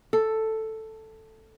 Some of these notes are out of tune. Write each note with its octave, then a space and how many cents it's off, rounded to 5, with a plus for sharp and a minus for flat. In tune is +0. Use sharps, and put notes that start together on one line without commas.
A4 +5